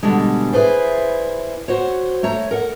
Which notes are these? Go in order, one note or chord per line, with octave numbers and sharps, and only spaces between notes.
B2 D3 G3 G#3
E4 G#4 B4 C5 D5
F#4 C5 C#5
A3 C#5 A#5
A#4 F#5